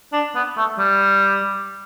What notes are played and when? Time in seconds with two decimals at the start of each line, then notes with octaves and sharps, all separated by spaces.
0.13 D4
0.35 B3
0.57 A3
0.79 G3